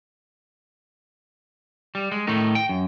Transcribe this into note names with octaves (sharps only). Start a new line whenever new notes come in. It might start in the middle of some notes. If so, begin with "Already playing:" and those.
G3
G#3
A2 D#3 A3 D#4
G5
F#2